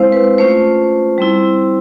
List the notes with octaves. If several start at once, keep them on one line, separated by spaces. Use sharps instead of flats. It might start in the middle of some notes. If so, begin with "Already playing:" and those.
Already playing: G#3 C4 E4 C5 F5
B4
A3 C#4 F4 C5
G3 C4 E4